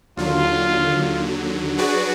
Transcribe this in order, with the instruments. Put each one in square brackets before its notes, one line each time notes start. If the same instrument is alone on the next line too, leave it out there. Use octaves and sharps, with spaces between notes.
[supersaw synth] D#2 D3 F#3 [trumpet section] F4
[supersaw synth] F#3 D4 G#4 B4 D5 [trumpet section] F#4